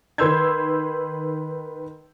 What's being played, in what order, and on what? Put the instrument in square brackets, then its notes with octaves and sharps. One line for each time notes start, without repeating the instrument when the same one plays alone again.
[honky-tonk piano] D#3 B4 C6 E6 G6 G#6